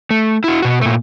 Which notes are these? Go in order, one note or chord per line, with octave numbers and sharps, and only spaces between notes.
A3
E4 F#4
B2 F#4
A#2 A3